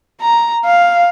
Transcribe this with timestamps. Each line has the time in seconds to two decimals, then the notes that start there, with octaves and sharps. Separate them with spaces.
0.21 A#5
0.65 F5